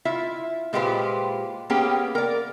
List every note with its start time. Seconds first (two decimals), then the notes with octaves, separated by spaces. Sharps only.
0.05 E4 F4 E5
0.73 A#2 G#3 F4 G4 B4 C5
1.70 A#3 B3 C#4 G4 G#4 G5
2.15 A#4 D5